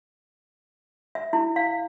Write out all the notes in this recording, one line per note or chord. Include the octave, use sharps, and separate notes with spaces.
E5
E4
F5